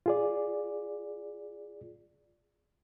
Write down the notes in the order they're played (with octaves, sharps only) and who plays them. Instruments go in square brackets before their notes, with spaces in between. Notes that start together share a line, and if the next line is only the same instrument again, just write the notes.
[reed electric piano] F4 G#4 D5